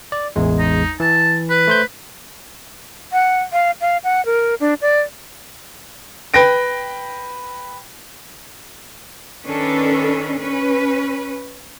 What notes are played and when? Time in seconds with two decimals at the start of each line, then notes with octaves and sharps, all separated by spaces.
0.12 D5
0.36 A1 E2 G#3
0.59 D#4
1.00 E3 A5
1.50 B4
1.68 A3 C5 G6
3.13 F#5
3.53 F5
3.81 F5
4.04 F#5
4.26 A#4
4.60 D4
4.82 D5
6.34 B4 G5 A#6 D7
9.46 D#3 C#4 D4 A4 B4
10.38 C#4 B4